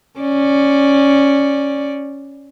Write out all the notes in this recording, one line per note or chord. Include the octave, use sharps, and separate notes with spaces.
C#4 D5